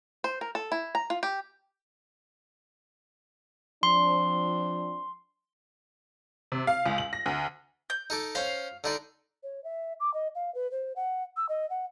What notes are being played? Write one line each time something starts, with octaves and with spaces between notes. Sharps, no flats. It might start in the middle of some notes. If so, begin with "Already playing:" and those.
C5
A#4
A4
E4
A#5
F4
G4
F3 C4 D4 C6
C3
F5
C#2
F#7
A#6
D2
G6
D#4 A4 D6
C#4 C5 F5
D3 D#4 D5
C#5
E5
D6
D#5
F5
B4
C5
F#5
E6
D#5
F#5